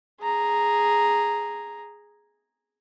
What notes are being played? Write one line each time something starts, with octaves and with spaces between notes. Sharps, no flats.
G#4 A#5